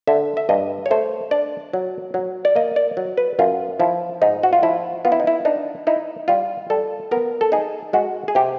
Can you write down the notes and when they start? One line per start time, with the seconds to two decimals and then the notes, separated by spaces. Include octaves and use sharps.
0.07 D3 E5
0.37 E5
0.49 G2 D#5
0.86 C#5
0.91 A3 C5
1.31 D4 D5
1.73 F#3
2.14 F#3
2.45 D5
2.56 A#3 D#5
2.76 D5
2.97 F#3
3.17 B4
3.39 F#2 F4
3.80 F3 E4
4.22 G#2 D#4
4.43 F#4
4.53 F4
4.62 F3 E4
5.05 B3 F4
5.12 E4
5.20 D#4
5.27 E4
5.45 D4 D#4
5.87 D#4 E4
6.28 G3 F4
6.70 G3 A4
7.11 B3 A#4
7.41 A4
7.52 D#4 G#4
7.93 G#3 F#4
8.28 G#4
8.35 C3 G4